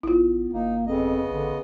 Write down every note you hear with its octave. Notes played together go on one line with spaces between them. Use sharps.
A1 B3 E4 F4
G1 A#3 D#4
F2 C#3 B3 D#5
A1 D3